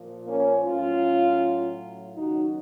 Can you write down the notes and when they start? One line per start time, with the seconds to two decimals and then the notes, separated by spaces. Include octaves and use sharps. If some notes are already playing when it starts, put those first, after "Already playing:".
Already playing: A#2 F3
0.27 A#3 C#4
0.64 A2 F#3 C#4 F4
2.16 D#2 C#3 F#3 D#4 F#4